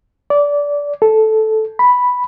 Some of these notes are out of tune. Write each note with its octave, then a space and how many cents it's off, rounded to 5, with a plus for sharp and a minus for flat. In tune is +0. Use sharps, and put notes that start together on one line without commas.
D5 -20
A4 -10
B5 +0